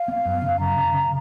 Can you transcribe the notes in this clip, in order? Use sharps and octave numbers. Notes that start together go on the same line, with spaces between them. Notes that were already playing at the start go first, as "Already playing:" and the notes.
Already playing: F5
B3
F#2
C#3
F#2 A#5
C#3
C#3